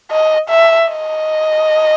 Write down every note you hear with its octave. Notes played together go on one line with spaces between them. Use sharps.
D#5
E5
D#5